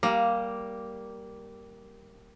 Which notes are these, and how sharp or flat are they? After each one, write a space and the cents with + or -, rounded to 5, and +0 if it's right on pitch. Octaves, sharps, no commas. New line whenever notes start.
G3 -10 A#3 +0